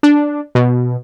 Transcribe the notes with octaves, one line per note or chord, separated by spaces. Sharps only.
D4
B2